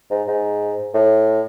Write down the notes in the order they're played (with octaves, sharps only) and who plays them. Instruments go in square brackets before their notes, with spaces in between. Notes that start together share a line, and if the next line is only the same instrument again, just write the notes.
[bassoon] G#2
G#2
A2